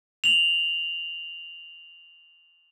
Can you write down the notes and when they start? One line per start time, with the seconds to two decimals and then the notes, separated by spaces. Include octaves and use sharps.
0.24 F7 F#7